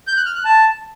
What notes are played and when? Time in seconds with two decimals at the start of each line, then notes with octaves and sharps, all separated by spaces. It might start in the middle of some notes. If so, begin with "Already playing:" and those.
0.07 G6
0.17 F#6
0.26 F6
0.36 F#6
0.45 A5